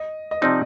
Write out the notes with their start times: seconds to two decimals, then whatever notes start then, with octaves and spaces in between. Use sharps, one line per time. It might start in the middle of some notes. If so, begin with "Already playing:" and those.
Already playing: D#5
0.31 D#5
0.41 C3 F3 C4 D#4 D5